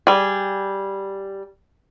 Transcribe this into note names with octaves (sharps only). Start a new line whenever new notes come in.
G3 G#4